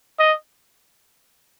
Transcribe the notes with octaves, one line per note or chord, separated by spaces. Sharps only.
D#5